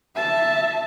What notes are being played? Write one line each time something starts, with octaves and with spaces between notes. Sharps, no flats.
E5 A5